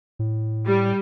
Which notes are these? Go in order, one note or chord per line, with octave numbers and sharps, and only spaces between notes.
A2
G3